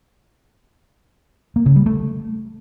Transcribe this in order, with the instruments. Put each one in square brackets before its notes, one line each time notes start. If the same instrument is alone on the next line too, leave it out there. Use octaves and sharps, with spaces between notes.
[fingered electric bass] A#3
C#3
G3
A3